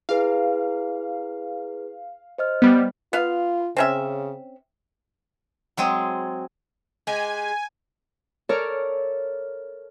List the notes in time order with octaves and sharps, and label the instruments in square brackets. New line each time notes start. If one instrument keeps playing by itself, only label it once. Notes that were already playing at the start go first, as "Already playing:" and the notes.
[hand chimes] E4 G#4 B4 [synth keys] F5
[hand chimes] C5 D#5 F6
[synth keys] G3 B3
[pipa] B3 F5 [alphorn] F4
[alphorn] C#3 [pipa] C4 C#4 E5
[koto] F#3 G#3 C4 G#4
[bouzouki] G#3 G4 [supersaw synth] G#5
[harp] A4 A#4 C#5 D5 C#6 F6